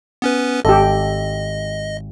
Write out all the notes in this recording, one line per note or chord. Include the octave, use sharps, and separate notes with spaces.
B3 C#4 B4
G#1 G4 A4 D#5